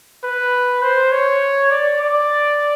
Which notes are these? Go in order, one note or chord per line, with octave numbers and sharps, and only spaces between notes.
B4
C5
C#5
D5
D5